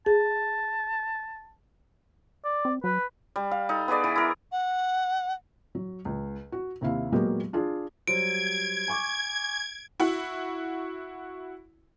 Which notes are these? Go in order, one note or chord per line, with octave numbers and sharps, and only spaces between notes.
G#4 A5
D5
C4
F#3 B4
G3
F5
D#4 A4
B3 G#4 B4 D5
E3
E4 A#4
F#5
F#3
C#2
F#4
D#2 C3 E4 F5
A#2 F#3 G#3 A#3 B3 G4
D4 F4 G#4
F#3 G3 C5 G#6 D7
G#5 C#6 D6
E4 F#4